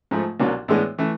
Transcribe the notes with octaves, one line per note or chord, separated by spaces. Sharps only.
G#2 F3 A3
C2 B2 F#3 A#3 D4
A2 E3 G#3 B3 D4
E3 A3